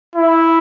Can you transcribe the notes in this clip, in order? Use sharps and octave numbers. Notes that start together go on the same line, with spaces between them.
E4